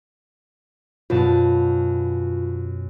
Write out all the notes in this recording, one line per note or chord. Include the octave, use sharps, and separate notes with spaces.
F#2 B2 F4 A5